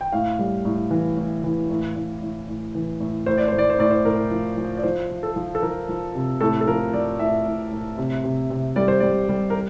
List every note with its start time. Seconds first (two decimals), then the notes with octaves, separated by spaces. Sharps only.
0.01 G5
0.12 A2 F5
0.39 G3
0.65 A2
0.91 E3
1.17 A2
1.44 E3
1.70 A2
1.96 A2
2.22 A2
2.48 A2
2.75 E3
3.00 A2
3.26 A2 C5
3.38 D5
3.48 A2 C5
3.58 D5
3.70 C5
3.79 A2 D5
3.91 C5
4.05 A2 A#4
4.31 F3
4.57 F3
4.77 D5
4.83 F3 C5
5.10 F3
5.23 A4
5.36 F3
5.55 A4
5.62 F3 A#4
5.89 F3
6.15 C3
6.41 A2 A4
6.61 A4
6.67 F3 A#4
6.93 F3 D5
7.19 A2 E5
7.46 A2
7.72 A2
7.98 C3
8.24 C3
8.50 C3
8.76 G3 D5
8.88 C5
9.00 G3 D5
9.29 G3
9.50 A#4